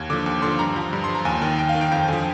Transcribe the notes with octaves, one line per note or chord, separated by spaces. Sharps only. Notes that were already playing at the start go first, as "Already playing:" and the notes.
Already playing: D#2 G#6
D3 F3 D6
D#2 D6
D3 F3 C6
G2 A#5
F3
G2
C6
F3
A#5
D#2 G#5
D#3 G5
D#2 G5
F5
D#3
G5
F2 G5
D3 F3 G#5